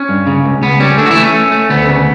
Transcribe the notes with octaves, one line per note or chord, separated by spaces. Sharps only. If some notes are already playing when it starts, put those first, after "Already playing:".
Already playing: C#4
G2
C#3
C#2
C#2 B3
G3 C#4
D3 A3 D4
F#4
E3 E4
A3
C#4
A3
A3
D2 B3
C#3